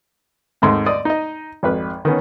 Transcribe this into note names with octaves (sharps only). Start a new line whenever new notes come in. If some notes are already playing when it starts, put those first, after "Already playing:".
D#2 G#2 A3 C4
D5 D#5 D#6
D#4 D#5
G#1 F2 B4
D#3 B3 C#4